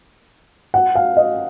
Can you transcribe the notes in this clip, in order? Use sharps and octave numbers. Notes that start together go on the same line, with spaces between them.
F#5
F5
D#5